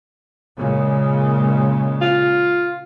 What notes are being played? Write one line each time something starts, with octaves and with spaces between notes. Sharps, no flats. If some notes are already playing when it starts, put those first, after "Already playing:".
A#2 C#3 G#3
F4